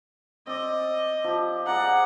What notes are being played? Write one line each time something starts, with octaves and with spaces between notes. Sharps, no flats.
C4 D5 D#5
F3 G4
G#4 D5 F#5 A#5